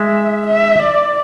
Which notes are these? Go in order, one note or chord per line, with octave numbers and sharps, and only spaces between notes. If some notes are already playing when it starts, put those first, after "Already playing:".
Already playing: G#3 E5
E5
D5